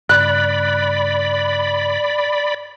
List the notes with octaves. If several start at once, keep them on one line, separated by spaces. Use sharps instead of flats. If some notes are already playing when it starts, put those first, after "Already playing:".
G2 C#3 D5 B5 F#6